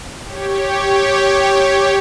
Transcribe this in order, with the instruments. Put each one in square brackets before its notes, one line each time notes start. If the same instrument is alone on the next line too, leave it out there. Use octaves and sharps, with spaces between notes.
[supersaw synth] G4 C#5